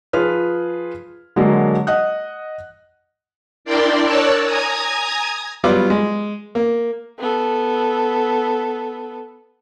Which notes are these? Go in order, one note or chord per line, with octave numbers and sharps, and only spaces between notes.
F3 F4 G#4 B4 F6
D3 F#3 G#3 A#3
D#5 F#5 D#6 F#6
D4 E4 A#4 D5 G5 C6
A#4 C#5 D5 A5 E6 F#6
G#5 A#5 D#6 G#6
F#3 G3 B3 F4 D6
G#3
A#3
B3 A4